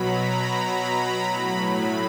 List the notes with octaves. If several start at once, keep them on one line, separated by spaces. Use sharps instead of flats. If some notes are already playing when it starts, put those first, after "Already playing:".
Already playing: B2 F#3 A#5 B5
B5
A2 F#3